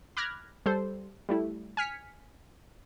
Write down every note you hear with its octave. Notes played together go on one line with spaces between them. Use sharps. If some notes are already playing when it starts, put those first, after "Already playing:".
B5 D6 F6 F#6 G#6 A#6
G3 A4 C5
G3 A3 E4
G#5 F6 B6 C#7